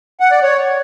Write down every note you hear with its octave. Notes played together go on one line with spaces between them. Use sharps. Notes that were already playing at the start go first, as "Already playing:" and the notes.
F#5
D5
C#5